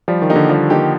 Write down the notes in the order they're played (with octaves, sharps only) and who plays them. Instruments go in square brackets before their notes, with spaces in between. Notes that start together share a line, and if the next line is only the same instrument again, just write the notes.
[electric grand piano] F3 [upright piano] G3
[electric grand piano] D#3
[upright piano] A#3 D#4 G4
[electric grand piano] D3
[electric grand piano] F3 [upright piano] G3
[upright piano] A#3 D#4 G4